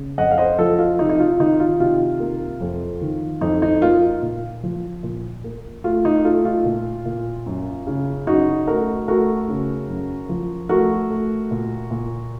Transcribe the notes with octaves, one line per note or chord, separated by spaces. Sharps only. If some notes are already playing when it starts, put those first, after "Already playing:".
Already playing: C#3
F2 D#5 F#5
F5
C5 D#5
F3 F4 A4
F4
C3 D#4
D#4
F4
D#3 D#4
F4
C3 F4
A#3
F2
D#3
F2 D#4
D#4
A#3 F4
A#2
F3
A#2
A#3
A3 F4
D#4
A3 F4
F4
A#2
A#2
F#2
C#3
F#2 D#4 F#4
A3 F#4 A#4
A3 F#4 A#4
C#3
F#2
F3
A3 F#4 A#4
A3
A#2
A#2